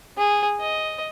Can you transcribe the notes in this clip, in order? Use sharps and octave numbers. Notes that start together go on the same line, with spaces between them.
G#4
D#5